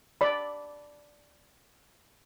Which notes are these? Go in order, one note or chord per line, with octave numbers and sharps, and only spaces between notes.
D5 B5